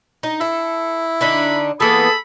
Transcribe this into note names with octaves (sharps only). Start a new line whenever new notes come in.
D#4
E4 A4
D3 D4 D#4 B5
E3 A#3 B3 G#4 A4 B5